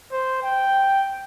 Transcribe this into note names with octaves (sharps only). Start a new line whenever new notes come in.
C5
G5